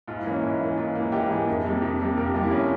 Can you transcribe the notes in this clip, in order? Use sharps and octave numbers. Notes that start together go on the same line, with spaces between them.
G#2 F4
E4
E3 A#3 C#4
G#2 E4
E3 A#3
G#2 F4
E3 A#3
G#2 G4
E3 A#3 G#4
F2
C3 G3 A#3
F2
C3 G3 A#3
F2 A#4
G4
C3 G3 A#3 F4
E4
F2 C#4